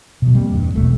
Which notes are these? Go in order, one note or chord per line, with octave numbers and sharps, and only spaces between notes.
B2 F3
G3 A#3 C4
E2 G2
E1 A#1 B2 A3